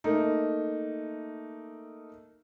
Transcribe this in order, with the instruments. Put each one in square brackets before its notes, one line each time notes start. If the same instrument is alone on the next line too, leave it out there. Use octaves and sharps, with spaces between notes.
[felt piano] A3 A#3 D#4